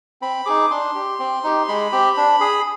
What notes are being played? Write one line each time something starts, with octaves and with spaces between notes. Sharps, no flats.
C4 B5
D#4 G#4 D6
D4 C6
G4
C4
D#4 G4
G#3 B5
C4 G4
D4
G#4